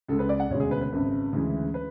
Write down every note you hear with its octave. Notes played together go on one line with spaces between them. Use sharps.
C#2 C#3 G#3 A4
B4
D5
F#5
E1 D2 C#3 G#3 C#5
G#4
B4
B4
G#1 F#2 C#3
D2 C#3 E3 G#3
B4